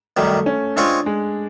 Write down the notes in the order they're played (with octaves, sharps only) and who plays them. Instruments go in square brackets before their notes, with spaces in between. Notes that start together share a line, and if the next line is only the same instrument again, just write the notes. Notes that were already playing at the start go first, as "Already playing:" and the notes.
[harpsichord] F#2 D#3 G3 [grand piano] A3
[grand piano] C#4
[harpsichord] G#3 C4 F4 G#4 C#5 [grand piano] D4
[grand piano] G#3